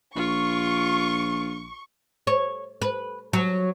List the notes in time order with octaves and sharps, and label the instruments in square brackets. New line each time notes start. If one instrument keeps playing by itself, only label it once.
[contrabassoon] A#1 [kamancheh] F4 [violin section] C#6
[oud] C#5
B4
F#3